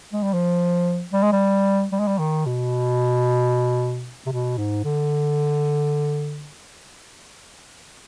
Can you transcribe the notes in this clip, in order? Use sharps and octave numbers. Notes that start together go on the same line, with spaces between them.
G#3
G3
F3
G3
G#3
G3
G3
G#3
G3
D#3
B2
C3
B2
G#2
D3